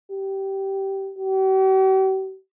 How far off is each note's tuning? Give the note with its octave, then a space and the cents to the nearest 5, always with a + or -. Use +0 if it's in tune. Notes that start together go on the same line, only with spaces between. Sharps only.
G4 -15
G4 -45